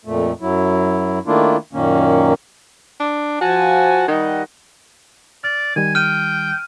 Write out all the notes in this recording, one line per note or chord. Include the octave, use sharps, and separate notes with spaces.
F2 A#2 A3
F#2 F#3 E4
D#3 A3 A#3 D4 E4 F4
F#2 A#2 D#3 A#3 C#4
D4
F3 F#4 G#5 A5
D#3 G3 D#5 F#5
D5 F6
D#3 G3 G#5
G5 F6 D#7